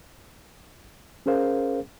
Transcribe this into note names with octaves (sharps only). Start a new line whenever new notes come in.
C#4 G#4 A#4 C5 F5